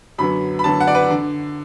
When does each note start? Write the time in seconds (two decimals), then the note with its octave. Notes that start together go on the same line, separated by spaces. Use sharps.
0.18 F#2 D3 F#3 B3 B5
0.59 B5
0.64 F#2 D3 F#3 B3 A5
0.80 F#5
0.87 D5
0.95 B4
1.10 D3